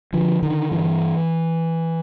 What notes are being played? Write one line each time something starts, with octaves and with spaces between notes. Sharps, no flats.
D3 F3
D3 D#3
G2 E3